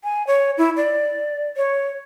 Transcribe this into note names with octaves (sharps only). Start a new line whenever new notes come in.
G#5
C#5
E4
D5
C#5